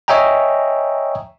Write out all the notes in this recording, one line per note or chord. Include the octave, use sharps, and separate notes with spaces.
C#5 D#5 E5 G5 G#5 A#5